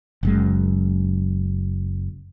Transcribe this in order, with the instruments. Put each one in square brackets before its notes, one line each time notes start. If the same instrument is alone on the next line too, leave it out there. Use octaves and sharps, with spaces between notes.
[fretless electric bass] F#1 F#2 G#3